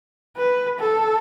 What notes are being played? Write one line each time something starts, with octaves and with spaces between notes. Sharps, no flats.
B4
A4